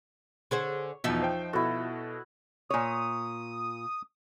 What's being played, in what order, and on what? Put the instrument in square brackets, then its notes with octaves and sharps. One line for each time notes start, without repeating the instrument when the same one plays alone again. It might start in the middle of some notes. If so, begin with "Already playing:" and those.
[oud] D3 G#4 C5 [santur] C#5
[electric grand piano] E2 B2 [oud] F3 D#4 E5
[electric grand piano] C5 G5
[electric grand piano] B2 A4 [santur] E4 F#4
[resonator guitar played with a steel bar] A#2 C#5 [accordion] D#6